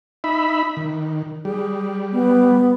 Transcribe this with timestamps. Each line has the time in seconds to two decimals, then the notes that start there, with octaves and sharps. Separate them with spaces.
0.24 D#4 E5 B5
0.77 D#3
1.45 G3 G#4
2.13 B3